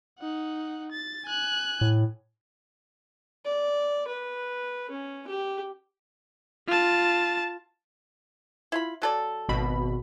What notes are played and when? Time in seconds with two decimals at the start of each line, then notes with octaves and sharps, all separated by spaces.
0.19 D#4 F#5
0.91 A6
1.25 G#5 F#6
1.81 A2
3.45 D5
4.08 B4
4.90 C#4
5.28 G4
6.67 F4 A5
8.72 E4 F4 B5
9.02 F#3 A4 D5
9.49 G#1 B2 B5